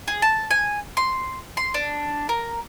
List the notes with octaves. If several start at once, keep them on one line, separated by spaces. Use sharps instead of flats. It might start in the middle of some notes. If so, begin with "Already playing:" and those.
G#4
A5
G#5
C6
C6
D4
A#4